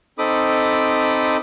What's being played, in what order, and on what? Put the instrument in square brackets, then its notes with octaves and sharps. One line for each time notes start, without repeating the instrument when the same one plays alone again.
[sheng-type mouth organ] C4 D#4 A4 B5 D6 D#6